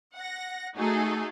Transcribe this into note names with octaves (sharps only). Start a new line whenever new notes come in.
F#5 A#6
A3 D#4 F#4 G#4 A4